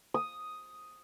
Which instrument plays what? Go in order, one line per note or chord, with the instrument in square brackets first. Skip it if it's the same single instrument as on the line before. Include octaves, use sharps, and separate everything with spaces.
[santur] D#6